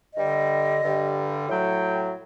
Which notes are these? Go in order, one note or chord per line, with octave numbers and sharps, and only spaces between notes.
G2 D3 G3 D#5
G2 D3 G3
A2 F#3 G5